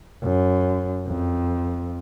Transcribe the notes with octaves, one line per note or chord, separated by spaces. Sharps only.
F#2
F2